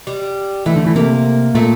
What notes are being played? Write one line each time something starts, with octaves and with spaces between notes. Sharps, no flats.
G3
E3 A3
D3
E3
C3 A#3
A#2 A3